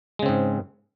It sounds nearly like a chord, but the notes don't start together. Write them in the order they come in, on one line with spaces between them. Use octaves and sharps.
G#3 C#3 C4 G#2